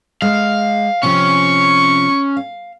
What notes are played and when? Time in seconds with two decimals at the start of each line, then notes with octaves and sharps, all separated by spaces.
0.22 G#3 F5
1.03 C3 F3 C#4 C#6
2.37 F5